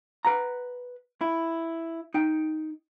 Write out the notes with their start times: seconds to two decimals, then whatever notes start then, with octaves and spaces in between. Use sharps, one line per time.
0.25 B4 F#5 A#5
1.21 E4
2.14 D#4 G5